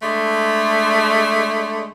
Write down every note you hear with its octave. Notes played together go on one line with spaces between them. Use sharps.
D3 G#3 A3